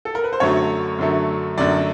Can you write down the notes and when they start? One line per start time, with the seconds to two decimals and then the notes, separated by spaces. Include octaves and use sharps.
0.05 A4
0.15 A#4
0.24 B4
0.33 C5
0.40 F#2 D3 F#3 A3 C#5
0.98 F#2 D3 F#3 A3
1.57 F#2 D3 F#3 A3 D5